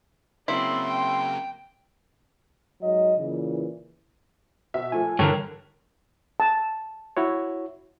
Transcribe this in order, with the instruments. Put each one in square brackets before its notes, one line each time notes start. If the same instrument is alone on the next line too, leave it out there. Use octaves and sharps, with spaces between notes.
[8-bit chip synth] C#3 F#3 A#3 [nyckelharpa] C4 D5 [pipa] E4 [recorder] C6
[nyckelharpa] G5
[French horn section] G#2 F#3 D#5
A#2 C#3 E3
[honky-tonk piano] B2 E5
[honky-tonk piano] A#2 F3 A3 [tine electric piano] G#5
[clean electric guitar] G2 D3 E3 [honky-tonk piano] A4 G5 A5 [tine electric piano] A#4 C#5
[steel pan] A5
[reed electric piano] E4 F#4 C#5